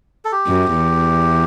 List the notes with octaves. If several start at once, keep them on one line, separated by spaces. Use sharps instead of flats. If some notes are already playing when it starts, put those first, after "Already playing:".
A4
G4
F#2
E2